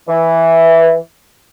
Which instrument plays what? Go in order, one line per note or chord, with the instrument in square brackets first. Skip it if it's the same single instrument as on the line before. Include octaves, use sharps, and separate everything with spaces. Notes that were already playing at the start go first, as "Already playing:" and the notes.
[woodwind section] E3